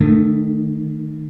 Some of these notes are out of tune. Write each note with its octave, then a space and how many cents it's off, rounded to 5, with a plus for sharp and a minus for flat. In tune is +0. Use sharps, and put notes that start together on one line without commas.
D#3 -15 A3 +0 D4 +30